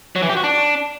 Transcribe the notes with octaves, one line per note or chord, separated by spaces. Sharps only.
F#3
E3
G4
F#4
D4